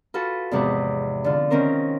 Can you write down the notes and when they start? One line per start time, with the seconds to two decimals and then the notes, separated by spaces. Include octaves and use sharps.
0.14 F4 F#4 A4 B4
0.51 E2 G#2 C3 F3 B4
1.24 D3 F4
1.50 D#3 C4 C#4 A#4 C5